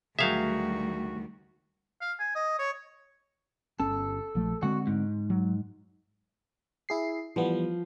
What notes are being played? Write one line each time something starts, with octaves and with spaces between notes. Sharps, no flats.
D2 D#3 F#3 G3 F#4 G#4 E5 F5
F5
G#5
D#5
C#5
G1 C#4 A4
A#1 F3 A3
D3 G#3 C4 F#4
G#2
F#3
E4 G#4 C7
E3 F3 G3 B3